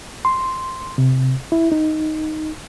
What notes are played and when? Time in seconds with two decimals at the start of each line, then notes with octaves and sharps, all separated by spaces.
0.25 C6
0.98 C3
1.52 E4
1.72 D#4